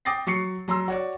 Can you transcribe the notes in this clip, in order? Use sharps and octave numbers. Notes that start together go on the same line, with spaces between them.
G5 D6 D#6 A6 A#6 C7
F#3 C#6 C7 C#7
F#3 A#5 C6 E6
F#4 C#5 D5